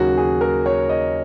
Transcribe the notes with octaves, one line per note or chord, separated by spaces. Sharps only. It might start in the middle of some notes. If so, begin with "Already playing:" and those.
Already playing: D#2 C#3 F#3 A#3 F#4 G#4
G#4
A#4
C#5
D#5